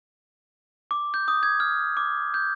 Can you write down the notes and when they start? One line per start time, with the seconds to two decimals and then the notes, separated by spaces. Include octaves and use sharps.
0.91 D6
1.14 G6
1.28 D#6
1.43 G#6
1.60 F6
1.97 D6
2.34 G6